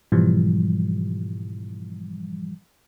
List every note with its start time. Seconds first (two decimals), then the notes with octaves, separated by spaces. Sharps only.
0.12 G#2 B2 E3 F3 G3